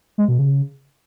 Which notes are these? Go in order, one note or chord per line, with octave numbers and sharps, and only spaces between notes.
G#3
B2
C#3